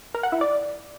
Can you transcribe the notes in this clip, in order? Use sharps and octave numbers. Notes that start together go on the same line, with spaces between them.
A#4
F#5
E4
D5